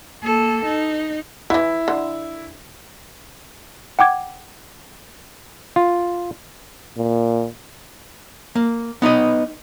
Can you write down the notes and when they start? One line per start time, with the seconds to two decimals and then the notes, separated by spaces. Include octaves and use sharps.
0.23 A#3 A4
0.65 D#4
1.50 D3 E3 E4
1.88 D3
3.99 F#5 G5 D6 G#6
5.76 F4
6.97 A#2
8.55 A#3
9.02 B3 D#4 B4 D#5